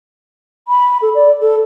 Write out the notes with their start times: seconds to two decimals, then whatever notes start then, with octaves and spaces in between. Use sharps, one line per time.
0.68 B5
1.02 A4
1.15 D5
1.41 A4